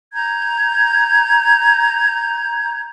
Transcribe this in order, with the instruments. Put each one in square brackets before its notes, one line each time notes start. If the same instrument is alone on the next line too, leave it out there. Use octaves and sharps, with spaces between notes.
[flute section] A#5 G6 G#6